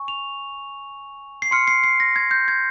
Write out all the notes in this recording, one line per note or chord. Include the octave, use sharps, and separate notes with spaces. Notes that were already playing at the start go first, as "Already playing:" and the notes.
Already playing: G#5 C#6
F7
C7
C6 F6 C#7
C7
C7
A#6
G#6
G6
G#6